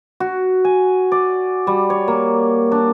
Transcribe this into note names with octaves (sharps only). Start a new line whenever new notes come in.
F#4
G#5
D5
G3
C#5
A#3
D4